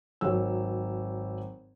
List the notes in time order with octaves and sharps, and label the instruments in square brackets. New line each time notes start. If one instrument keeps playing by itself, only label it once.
[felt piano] G#1 F#3 C#5 E6